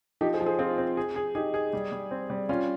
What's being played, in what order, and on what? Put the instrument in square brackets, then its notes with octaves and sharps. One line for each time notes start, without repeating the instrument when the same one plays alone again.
[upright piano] F3 [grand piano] D#4 G4
[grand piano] G#4 C5
[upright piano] F3
[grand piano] G#4 C5
[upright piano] C4 [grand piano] F4 G#4
[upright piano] C4
G#4
G#4
[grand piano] D#4 G4 [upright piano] G#4
[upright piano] G#4
G3
G3
C4
G3
[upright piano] G3 [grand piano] C#4 F4